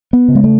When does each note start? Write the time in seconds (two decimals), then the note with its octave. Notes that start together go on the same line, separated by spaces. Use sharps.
0.13 B3
0.28 C#3
0.35 G#3
0.44 A3